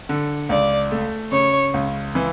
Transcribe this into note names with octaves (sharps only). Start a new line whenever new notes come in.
D3
C#2 D5
A3
C#3 C#5
C#2
E3